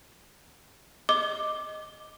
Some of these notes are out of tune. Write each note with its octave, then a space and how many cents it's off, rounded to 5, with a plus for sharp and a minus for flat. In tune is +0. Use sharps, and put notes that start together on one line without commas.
D#5 -5 D6 +0